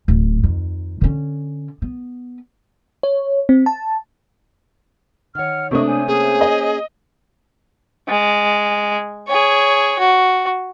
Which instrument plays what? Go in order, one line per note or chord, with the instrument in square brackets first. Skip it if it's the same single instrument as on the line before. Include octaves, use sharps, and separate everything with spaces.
[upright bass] D1
F2 D#3
D3 C#4
B3
[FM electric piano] C#5
C4
A5
[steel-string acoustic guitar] D#3 C#5 [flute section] F#5 F6
[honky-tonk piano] C3 A3 D#6 [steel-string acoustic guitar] A#3 D4 [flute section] C#5 D#5 C#6
[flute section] C5 C#5 G#5
[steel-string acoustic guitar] A#3 C#4 [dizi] G#4
[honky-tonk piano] D#5
[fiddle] G#3
G#4 C#5
F#4